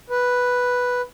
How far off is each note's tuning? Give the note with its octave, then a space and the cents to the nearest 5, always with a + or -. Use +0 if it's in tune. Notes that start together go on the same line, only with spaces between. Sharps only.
B4 +0